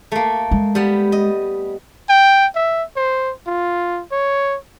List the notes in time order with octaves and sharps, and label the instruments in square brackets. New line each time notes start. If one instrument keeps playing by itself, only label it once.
[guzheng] A3 A#3
[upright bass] G#3
[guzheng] G3 B3
D#5
[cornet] G5
E5
C5
F4
C#5